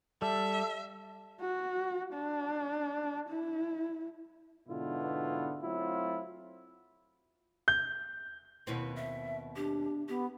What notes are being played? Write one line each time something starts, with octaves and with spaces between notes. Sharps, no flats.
G3 A4 E5
F#4
D4
E4
G#2 B2 D3 B3 E4 F4
F#3 A3 C4 E4 F4
G6
D#2 B2 C4 E4
E5
D4 G4
B3 G4